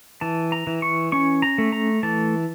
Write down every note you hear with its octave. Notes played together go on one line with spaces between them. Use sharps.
E3 A5
A#5
E3
C#6
C#4 C#6
A#5
A3
A#5
E3 A5